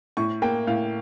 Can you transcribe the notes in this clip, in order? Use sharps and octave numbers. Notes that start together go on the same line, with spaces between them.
A2 C#6
A#3 G5
A2 F5